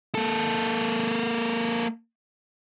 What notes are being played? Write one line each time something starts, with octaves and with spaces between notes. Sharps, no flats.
A#3 A4